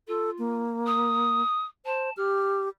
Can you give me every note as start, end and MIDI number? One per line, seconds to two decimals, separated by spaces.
0.08 0.63 65
0.08 0.30 69
0.39 1.42 58
0.87 1.65 87
1.86 2.10 72
1.86 2.13 81
2.17 2.69 67
2.17 2.62 89